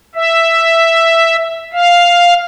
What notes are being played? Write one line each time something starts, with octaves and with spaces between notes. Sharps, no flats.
E5
F5